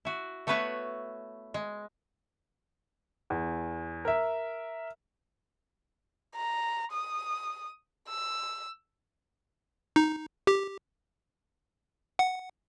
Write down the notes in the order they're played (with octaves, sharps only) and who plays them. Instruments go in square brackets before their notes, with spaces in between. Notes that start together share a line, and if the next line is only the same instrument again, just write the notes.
[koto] E4 F#4
A3 B3 F#4 B4 C#5 E5
G#3
[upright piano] E2
A#4 E5
[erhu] A#5
D#6
E6
[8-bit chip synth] D#4
G4
F#5